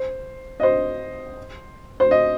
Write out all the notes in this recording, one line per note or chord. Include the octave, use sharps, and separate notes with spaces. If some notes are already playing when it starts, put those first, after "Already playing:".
Already playing: C5
D#5
C5
C5
D#5